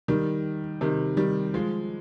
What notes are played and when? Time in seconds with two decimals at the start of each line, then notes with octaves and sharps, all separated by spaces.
0.08 D#3 G3
0.81 C3 D#3
1.17 D#3 G3
1.54 F3 G#3